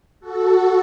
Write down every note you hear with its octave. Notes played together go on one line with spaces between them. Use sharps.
F#4 A4